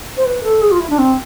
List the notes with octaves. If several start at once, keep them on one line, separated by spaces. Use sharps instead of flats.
C5
B4
A4
G#4
F4
E4
D4
C4